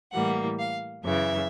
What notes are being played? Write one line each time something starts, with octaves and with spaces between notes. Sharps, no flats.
A2 E3 G3 A#3 F#5
F5
F#2 C#3 E3 E5